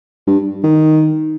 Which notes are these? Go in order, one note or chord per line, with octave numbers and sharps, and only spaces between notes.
G2
D#3